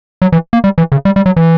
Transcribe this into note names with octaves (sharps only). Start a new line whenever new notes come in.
F#3
E3
A#3
G3
E3
C#3
G3
G3
F#3
E3